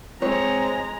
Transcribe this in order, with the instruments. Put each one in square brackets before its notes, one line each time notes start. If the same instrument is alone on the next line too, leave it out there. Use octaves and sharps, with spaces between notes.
[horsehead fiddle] G#3 A#5 [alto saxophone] C4 [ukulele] C#5